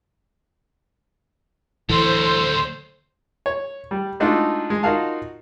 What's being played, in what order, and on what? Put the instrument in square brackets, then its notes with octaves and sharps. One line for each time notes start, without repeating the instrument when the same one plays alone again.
[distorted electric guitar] D2 F#3 [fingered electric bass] E3 [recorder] A4 [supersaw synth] C5
[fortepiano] C#5
G3
G#3 A3 D4 D#4 F4 F#4
G#3
D#4 F4 F#4 A#4 F5 A5